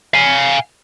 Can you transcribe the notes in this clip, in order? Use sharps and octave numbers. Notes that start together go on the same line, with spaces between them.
F5 G#5